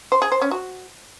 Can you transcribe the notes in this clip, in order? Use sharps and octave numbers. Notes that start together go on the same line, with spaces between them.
C5
G#4
C5
C#4
F#4